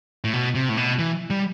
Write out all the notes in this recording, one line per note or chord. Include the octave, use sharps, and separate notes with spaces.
A2
B2
C3
A2
B2
E3
G3